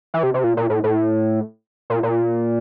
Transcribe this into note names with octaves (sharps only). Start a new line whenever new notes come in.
E3
C3
C3
A#2
A#2
A2
A2
A#2
A#2